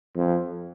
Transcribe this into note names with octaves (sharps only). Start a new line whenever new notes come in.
F2